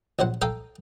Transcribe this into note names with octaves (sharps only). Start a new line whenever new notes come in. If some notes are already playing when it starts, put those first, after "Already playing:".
A#1 F#3 C5 F#5
A4 F5 G5 A#5 D#6